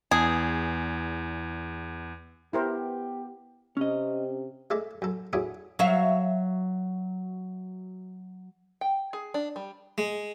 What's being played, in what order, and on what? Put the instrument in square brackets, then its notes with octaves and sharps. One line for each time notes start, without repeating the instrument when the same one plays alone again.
[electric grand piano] E2 [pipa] G#4
[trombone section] B3 G4 [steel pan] E4 A#4 C5
[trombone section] C3 [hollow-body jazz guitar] C#4 D#5
[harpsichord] G#3 A3 A4 D5
F#2 A4
C#4 D4 E4 F#4 G#4 A4
[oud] F#3 E5 F5
[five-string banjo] G5
G#4
D4
G3
[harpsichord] G#3